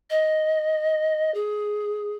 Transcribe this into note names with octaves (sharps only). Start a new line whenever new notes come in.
D#5
G#4